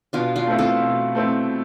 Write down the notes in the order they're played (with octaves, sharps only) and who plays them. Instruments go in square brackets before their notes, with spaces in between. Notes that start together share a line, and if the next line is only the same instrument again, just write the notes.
[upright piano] B2 [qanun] D4 F4
[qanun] D4 F4
[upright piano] A3 C4 E4
[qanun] F4 A4
[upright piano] B2
A3 C4 E4